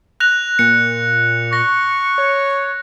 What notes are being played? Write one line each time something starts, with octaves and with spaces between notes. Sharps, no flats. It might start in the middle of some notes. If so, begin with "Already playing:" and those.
F#6 A#6 F7
A#2 C#7
C#6 A#6
C#5